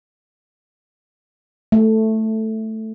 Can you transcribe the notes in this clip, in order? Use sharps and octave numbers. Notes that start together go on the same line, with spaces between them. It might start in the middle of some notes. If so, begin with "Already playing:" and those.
A3